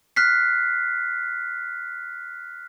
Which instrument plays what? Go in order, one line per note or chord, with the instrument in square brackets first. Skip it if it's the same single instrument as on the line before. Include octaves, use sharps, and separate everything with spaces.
[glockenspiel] F6 F#6 B6 C7